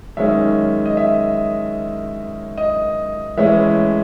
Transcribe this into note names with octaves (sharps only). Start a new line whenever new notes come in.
F#2 D#3 G#3 C#4 E5
D#5
E5
D#5
A2 E3 G#3 C#4 E5